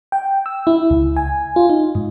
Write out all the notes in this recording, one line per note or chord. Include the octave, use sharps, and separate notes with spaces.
G5
E6
E4
C#2
G#5
F4
D#4
G#2